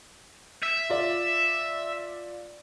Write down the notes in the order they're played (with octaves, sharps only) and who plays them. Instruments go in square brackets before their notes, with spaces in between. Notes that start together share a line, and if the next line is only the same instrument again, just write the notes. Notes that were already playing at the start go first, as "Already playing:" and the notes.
[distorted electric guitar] E5
[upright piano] F4 D5